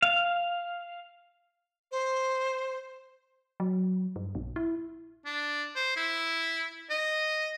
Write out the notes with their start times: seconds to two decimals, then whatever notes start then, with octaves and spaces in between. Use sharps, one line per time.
0.02 F5
1.92 C5
3.60 F#3
4.16 G2
4.35 A#1
4.56 E4
5.26 D4
5.76 C5
5.96 E4
6.90 D#5